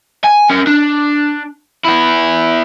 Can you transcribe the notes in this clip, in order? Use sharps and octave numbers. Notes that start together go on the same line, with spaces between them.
G#5
C#4 A#4
D4
B3 E4